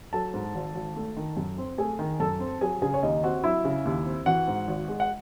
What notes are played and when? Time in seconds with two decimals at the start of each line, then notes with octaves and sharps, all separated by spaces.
0.13 F#3 A4 A5
0.34 G#2
0.55 G#1
0.75 G#1
0.96 A3
1.17 D#3
1.37 F#2
1.58 C4
1.78 A3 G#4 G#5
1.99 D#3
2.20 F#2 A4 A5
2.40 C4
2.61 F#3 G#4 G#5
2.82 C#3 G#4 G#5
2.94 C#5
3.02 D#2 D#4 D#5
3.23 C4 F#4 F#5
3.44 F#3 E4 E5
3.65 C#3
3.85 D#2
4.06 C4
4.26 E3 F#4 F#5
4.47 G#2
4.68 G#1
4.88 G#3
5.00 F#5